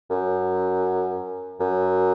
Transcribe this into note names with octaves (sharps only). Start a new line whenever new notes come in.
F#2
F#2